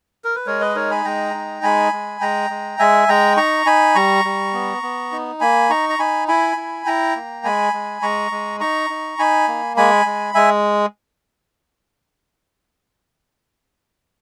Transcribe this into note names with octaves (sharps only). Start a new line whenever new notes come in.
A#4
B4
G#3 A#4 C#5
B4 D#5
D#4 A#4 C#5
G#5 B5
G#3 G5 A#5
D#4
G#3 G#5 B5
G#3
G#3 G5 A#5
G#3
G#3 E5 G#5
G#3 G5 A#5
D#4 A#5 C#6
D#4 G#5 B5
G3 A#5 C#6
G3
B3
B3
D#4
A#3 G#5 B5
D#4 A#5 C#6
A#5
D#4 G#5 B5
E4 G#5 B5
E4
E4 G5 A#5
A#3
G#3 G#5 B5
G#3
G#3 A#5 C#6
G#3
D#4 A#5 C#6
D#4
D#4 G#5 B5
A#3
G#3 G#5 B5
G#3
G#3 E5 G#5